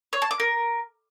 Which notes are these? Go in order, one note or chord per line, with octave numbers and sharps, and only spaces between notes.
C#5
A5
D6
A#4